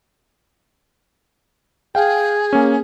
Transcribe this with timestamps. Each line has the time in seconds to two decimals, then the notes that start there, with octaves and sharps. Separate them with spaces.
1.95 G#4 F5 G5
2.53 A#3 C#4